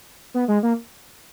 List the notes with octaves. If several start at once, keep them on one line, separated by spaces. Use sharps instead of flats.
B3
G#3
A#3